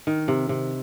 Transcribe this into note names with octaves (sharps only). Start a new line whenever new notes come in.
D#3
C3
C3